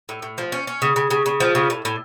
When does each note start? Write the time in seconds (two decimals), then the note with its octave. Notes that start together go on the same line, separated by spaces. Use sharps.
0.09 A2
0.22 A2
0.38 F3
0.52 C#4
0.67 C#4
0.82 C#3
0.96 C#3
1.10 C#3
1.26 C#3
1.40 F3
1.55 C#3
1.70 A2
1.85 A2